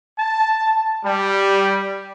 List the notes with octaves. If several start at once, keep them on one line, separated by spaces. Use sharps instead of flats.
A5
G3